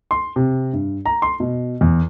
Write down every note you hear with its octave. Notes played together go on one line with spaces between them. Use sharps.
C6
C3
G2
A#5
C6
B2
E2